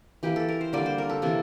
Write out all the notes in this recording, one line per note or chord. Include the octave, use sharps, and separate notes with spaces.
E3 A#3 G4
A4
A#4
C5
D3 G3 A#3 D5
C5
A#4
A4
C3 E3 A#3